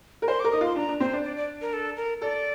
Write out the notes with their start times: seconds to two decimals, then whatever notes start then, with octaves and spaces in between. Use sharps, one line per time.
0.22 A#4
0.28 C5 C6
0.40 D6
0.44 A#4
0.52 D#4 D#6
0.61 F4 C6
0.76 D4 A#5
0.89 D4
1.00 C4 C5
1.13 D4
1.24 D5
1.37 D5
1.61 A#4
1.73 A4
1.97 A#4
2.21 A4 D5